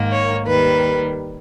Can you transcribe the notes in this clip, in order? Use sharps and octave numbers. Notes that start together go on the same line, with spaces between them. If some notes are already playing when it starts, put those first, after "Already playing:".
Already playing: G#2 D#3 A#3
C#5
D#2 D#3 G3 B4